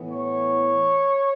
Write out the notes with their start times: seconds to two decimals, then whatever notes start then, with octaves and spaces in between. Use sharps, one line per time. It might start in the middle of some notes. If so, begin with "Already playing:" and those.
Already playing: A2 E3 B3
0.11 C#5